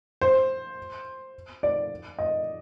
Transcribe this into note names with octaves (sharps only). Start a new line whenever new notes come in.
C5
D5
D#5